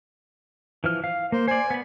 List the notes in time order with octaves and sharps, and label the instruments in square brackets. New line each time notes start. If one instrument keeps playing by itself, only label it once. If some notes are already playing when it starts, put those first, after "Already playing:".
[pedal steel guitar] E3 F3 F6
F5
[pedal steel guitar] A#3 [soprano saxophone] C5
[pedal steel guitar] C5 D5 [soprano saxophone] G#5
[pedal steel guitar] B3 B5